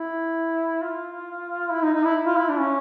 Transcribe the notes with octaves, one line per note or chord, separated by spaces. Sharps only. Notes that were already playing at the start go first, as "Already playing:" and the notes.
Already playing: E4
F4
E4
D#4
D#4
E4
F4
E4
D4
C#4